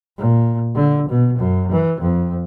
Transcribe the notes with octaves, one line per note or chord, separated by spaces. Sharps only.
A#2
D3
B2
F#2
E3
F2